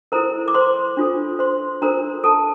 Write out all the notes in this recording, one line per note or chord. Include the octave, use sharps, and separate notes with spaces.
E4 A4 A#4 C5 A#5
D6
C5 C6
D4 F4 A4 C5
C5 C6
D4 F4 A4 A#4 C5 A#5
A4 A5